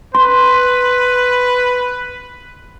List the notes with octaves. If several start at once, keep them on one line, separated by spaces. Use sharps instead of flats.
B4 C6